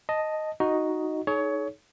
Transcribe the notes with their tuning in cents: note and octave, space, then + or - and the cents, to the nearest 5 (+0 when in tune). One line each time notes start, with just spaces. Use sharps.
D#5 +0 A5 +0
D#4 +5 F#4 +0 D#5 +0
D#4 +0 G#4 +40 C#5 +20